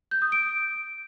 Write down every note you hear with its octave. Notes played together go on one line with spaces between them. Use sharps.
G6
D#6
D7